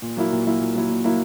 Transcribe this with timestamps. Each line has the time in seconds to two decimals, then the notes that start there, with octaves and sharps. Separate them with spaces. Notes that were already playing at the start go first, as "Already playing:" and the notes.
0.02 A#2
0.17 F#3 A#3 E4
0.32 A#2
0.46 F#3 A#3 E4
0.60 A#2
0.75 F#3 A#3 E4
0.89 A#2
1.04 F#3 A#3 E4